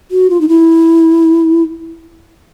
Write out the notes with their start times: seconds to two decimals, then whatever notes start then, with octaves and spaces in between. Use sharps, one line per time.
0.11 F#4
0.30 F4
0.41 D#4
0.48 E4